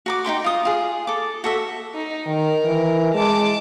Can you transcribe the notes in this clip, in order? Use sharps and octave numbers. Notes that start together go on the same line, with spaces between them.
F#4 A#5 D6
D#4 E4 G5 C6
F4 D#6
F4 G#4
A4 D6
F#4 A4 E5
D#4
D#3 A#4
E3
G#3 A5 D6